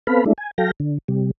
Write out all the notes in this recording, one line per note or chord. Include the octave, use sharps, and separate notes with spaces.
B3 C4 A4 B4 F5 B5
G#3 A3 D4 E4
G#5
F#3 A4 F5 G5 A#6
D3
C3 G3